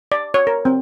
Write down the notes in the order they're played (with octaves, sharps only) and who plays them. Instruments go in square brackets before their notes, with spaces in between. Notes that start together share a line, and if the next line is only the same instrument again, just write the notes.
[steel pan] D5
C#5
A#4
C4